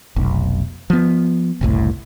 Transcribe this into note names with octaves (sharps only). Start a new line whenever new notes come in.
F1 B1
F3 B3
F#1 C2 A2